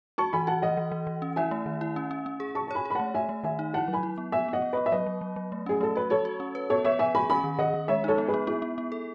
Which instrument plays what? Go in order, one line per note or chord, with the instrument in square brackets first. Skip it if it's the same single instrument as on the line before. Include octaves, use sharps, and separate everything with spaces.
[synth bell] F#4 [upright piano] A5 C#6
[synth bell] E3 [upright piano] G#5 B5
[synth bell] F#4 [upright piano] F#5 A5
[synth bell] E3 [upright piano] D#5 F#5
[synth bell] E3
E3
E3
C#4
[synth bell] E4 [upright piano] E5 G#5
[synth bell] A3
D#3
E4
C#4
C#4
C#4
G#4
[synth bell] G#4 [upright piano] A5 C#6
[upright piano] A5
[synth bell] C#5 [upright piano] G#5 B5
[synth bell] G#4 [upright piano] B5
[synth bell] A3 [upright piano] F#5 A5
[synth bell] A3 [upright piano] E5 G#5
[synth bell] A3
[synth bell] D#3 [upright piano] E5 G#5
[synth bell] D#4
[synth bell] E4 [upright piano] F#5 A5
[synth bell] F#3
[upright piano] G#5 B5
[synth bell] E4
B3
[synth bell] B3 [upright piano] E5 G#5
[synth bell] B3
[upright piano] D#5 F#5
[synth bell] B3
[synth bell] B3 [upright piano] B4 D#5
[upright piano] E5
[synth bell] F#3 [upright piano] B4 D#5
[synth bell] F#3
F#3
F#3
A3
[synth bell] C#4 [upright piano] G#4
[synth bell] A3 [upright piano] A4
[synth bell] F#4 [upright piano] B4
[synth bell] F#4 [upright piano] A4 C#5
[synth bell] F#4
C#4
B4
[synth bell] B3 [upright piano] A4 C#5
[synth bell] B3 [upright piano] C#5 E5
[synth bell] B3 [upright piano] E5 G#5
[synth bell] G#4 [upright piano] G#5 B5
[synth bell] C#4 [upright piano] G#5 B5
[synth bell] D#3
[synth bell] D#3 [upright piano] D#5 F#5
[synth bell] D#3
[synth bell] G#3 [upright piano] C#5 E5
[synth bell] D#4 [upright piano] A4 C#5
[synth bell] B3
[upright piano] G#4 B4
[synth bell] B3
[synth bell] B3 [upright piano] E4 G#4
[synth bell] B3
B3
A4